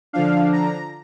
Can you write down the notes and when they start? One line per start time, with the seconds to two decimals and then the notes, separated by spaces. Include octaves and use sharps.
0.13 D3 F3 D4 F5
0.52 A#5